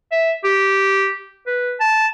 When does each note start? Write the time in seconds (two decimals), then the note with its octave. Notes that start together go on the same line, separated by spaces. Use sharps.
0.12 E5
0.44 G4
1.46 B4
1.80 A5